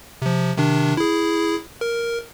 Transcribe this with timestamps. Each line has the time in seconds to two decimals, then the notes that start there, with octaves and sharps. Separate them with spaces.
0.22 C3 F3
0.57 C3 D#3 D4
0.97 E4 G#4
1.81 A#4